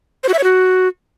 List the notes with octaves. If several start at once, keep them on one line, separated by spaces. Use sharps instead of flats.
C5
F#4
E5
C#5
F#4